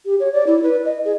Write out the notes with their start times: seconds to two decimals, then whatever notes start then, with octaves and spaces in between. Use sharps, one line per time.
0.05 G4
0.20 C#5
0.32 D5
0.47 E4
0.63 B4
0.85 D#5
1.05 G#4